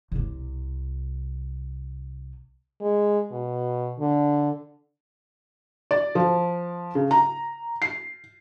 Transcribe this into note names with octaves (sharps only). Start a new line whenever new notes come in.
C2 C3
G#3
B2
D3
D5
F3
C#3
A#5
C7